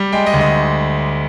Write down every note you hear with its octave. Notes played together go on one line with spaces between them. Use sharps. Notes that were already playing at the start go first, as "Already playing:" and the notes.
Already playing: G3
G#3 G5
D#5
D2
D#5